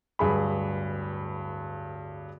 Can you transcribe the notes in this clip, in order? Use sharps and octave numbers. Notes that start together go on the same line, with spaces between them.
D1 G2 G#4 B5